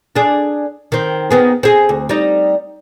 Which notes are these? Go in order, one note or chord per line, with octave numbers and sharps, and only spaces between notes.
D4 G#4
D#3 C4
D#3 B3 G#4
C4 G#4
D2
G3 D#4